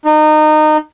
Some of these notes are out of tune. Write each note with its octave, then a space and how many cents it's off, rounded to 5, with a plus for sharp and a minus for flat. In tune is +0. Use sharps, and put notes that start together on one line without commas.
D#4 -25